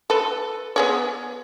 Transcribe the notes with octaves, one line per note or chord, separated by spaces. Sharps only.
A4 B4
B3 G#4 C#5